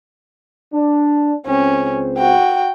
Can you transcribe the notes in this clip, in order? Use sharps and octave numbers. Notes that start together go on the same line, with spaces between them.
D4
C#2 C4 C#4
F#4 G5